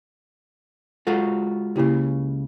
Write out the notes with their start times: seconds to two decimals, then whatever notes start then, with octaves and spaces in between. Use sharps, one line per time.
1.07 G#3 F4 F#4 A4
1.76 C#2 C#3 A#3 E4 G4